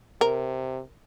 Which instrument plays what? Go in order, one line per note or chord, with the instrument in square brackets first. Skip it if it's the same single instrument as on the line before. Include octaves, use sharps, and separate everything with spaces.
[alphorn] C3 [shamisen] A#4